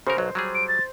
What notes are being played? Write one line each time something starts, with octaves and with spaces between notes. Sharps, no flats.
C#3 F#4 A#4 C5
B1 F#3
F#3 G3 G#4
D7
A6